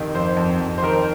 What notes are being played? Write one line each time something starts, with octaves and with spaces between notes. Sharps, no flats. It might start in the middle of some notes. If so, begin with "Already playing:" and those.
Already playing: F2 C3 D#3
F2 C5
F2
F2
C5
D#3 A#4